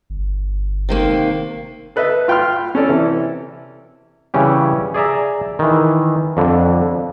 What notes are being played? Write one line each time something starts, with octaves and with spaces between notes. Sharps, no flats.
G1
C3 D#3 A#3
A4 B4 D#5 E5
F4 G5 B5 C6 F6
C#4 A4 D5
C3 E3
C#3 E3 G3 C#4 G4
G#4 D5 E5 A#5
D#3 E3
F2 D3